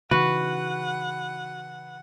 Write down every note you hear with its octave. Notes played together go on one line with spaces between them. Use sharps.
C#3 E3 D#4 F#4 B4 F#5